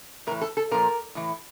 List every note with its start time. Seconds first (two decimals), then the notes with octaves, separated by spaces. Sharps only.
0.27 A2 A#4
0.31 E3
0.41 A4
0.57 A4
0.71 A#2 F3 A#4
1.15 A2 E3